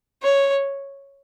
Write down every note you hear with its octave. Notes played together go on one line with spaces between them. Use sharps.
C#5